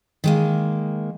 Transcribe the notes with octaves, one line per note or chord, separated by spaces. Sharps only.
D#3 G#3 A#3